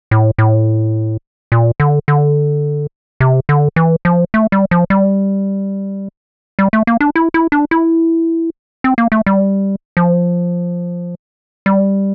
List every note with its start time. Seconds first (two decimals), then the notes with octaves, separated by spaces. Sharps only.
0.11 A2
0.38 A2
1.52 A#2
1.80 D3
2.08 D3
3.20 C3
3.49 D3
3.76 E3
4.05 F3
4.34 A3
4.52 G3
4.71 F3
4.90 G3
6.59 G3
6.73 A3
6.87 A#3
7.01 D4
7.16 E4
7.34 E4
7.52 D4
7.71 E4
8.84 C4
8.98 A#3
9.12 A3
9.26 G3
9.97 F3
11.66 G3